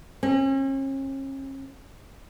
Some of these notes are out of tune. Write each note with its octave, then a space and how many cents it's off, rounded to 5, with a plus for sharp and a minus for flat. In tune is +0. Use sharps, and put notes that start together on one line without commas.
C#4 -40